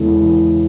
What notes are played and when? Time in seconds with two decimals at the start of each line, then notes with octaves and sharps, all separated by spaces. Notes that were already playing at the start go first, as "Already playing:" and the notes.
Already playing: E2 C#3 E3 G#3 A4
0.23 E3